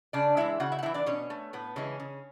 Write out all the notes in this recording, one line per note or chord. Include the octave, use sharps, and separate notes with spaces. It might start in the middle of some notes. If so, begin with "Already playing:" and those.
C#3 D4 D5
E3 G#3 E4 E5
C#3 F#4 F#5
E4 E5
F#5
E3 A3 E4 E5
D4 D5
B2 C#4 C#5
A3
A2 B3 B4
C#3 E3 G#3 C#4
C#3